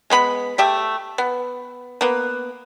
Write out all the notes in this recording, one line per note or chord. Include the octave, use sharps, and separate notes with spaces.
G#3 B3 B5
A3 G4 E5
B3
A#3 B3